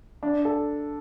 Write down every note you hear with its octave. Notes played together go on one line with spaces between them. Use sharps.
D4
A4